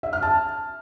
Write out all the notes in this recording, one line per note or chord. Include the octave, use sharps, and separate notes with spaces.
E5
F6
A5